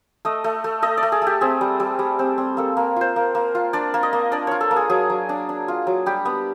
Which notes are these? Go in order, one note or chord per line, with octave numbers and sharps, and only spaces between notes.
A3 D#5
A3
A3
A3 D#5
D5
A3
G#4
A3 G4
C4 G#4
G3
G3
G3
C4
C4
A#3 A4
A#3
F4 C5
A#3
A#3
F4
D4 D5
A#3
D#5
A#3
D4 D5
F4 C#5
A4
A#3
G#4
F#3 G#4
F#3
D4
D4
F4
F#3
G3 G4
B3